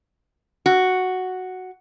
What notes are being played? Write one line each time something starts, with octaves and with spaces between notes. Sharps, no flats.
F#4